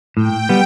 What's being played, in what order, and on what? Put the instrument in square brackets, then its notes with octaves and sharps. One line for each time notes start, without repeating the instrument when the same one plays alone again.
[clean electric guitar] A2 [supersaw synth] G5
[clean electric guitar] G3 B3